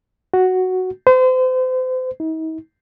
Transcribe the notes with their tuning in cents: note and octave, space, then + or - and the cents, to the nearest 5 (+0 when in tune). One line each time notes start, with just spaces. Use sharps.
F#4 +0
C5 -35
D#4 +45